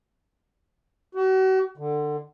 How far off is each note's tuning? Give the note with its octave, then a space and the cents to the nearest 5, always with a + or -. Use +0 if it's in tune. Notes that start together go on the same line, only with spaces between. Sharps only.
F#4 +40
D3 +20